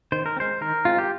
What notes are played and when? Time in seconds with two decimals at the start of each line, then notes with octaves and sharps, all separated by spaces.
0.12 D#3 C5
0.26 A#4
0.37 C4
0.40 G#3 C5
0.61 D#3 A#4
0.85 G#3 C4 F4
0.98 G4